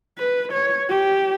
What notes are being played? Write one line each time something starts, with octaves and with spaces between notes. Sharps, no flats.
B4
C#5
G4